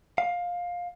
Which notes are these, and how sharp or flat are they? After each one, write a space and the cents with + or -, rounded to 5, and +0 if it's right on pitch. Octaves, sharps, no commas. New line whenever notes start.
F5 +15